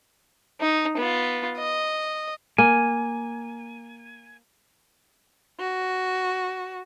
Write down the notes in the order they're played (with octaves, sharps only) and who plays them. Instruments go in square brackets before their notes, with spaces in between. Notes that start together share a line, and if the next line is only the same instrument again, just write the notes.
[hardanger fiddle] D#4
B3 F4
D#5
[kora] A#3 [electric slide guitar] G#5
[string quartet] F#4